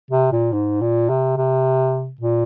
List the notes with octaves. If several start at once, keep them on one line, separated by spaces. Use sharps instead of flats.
C3
A#2
G#2
A#2
C3
C3
A#2